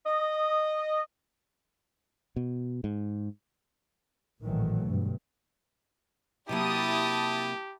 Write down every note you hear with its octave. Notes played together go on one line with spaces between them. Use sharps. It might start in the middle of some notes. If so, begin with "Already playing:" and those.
D#5
B2
G#2
A1 A#2 D#3 E3 F#3 A3
D2 G2 B2
C3 F#3 A#3 E4 G4 A5 D#6